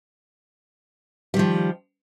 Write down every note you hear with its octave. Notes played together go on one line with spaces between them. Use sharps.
D#3 F3 G3